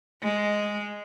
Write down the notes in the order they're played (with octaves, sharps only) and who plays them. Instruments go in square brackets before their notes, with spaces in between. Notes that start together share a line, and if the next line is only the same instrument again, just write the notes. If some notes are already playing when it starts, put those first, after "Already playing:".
[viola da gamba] G#3